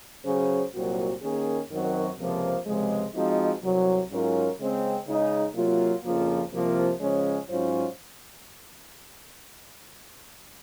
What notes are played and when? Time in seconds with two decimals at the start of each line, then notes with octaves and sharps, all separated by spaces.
0.25 C#3 F#3 C#4 G#4 C5
0.73 C2 A#2 F#3 C4 F#4
1.21 D#3 A#3 C#4 G#4
1.70 F#2 D#3 F#3 C4 F#4
2.18 C#2 C3 F3 A#3
2.66 C#2 C3 F3 G#3
3.14 F3 G#3 C4 D#4 F#4
3.63 C2 C3 F#3
4.10 G#2 F#3 C#4 F4 A#4
4.59 C#3 G#3 C4
5.07 C#3 G#3 D#4
5.55 C3 F#3 A#3 F4
6.03 F2 C#3 F3 A#3 F4
6.52 C2 C3 F3 A#3 F4
7.00 C#3 F3 G#3 C#4
7.48 G#2 F#3 C#4 F4 C5